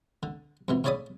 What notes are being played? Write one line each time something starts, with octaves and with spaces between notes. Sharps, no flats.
D3
F2 B2 E3
A2 C#3 C#5 D5 B5 D#6